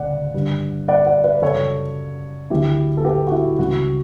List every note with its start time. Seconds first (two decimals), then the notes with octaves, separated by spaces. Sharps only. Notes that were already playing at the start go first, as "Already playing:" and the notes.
Already playing: D2 C#3 D5 F#5
0.34 G2 D3 G3
0.88 D5 F#5
1.06 D5 F#5
1.24 B4 D5
1.42 F#2 C#3 G3 A4 C#5
2.50 D2 D3 F#3 E4 G4
2.97 A4
3.05 G4 B4
3.27 F#4
3.32 E4
3.59 C#2 C#3 G3 F#4